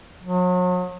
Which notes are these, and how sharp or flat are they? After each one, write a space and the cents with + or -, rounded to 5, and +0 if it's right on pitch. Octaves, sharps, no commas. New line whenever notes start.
F#3 -40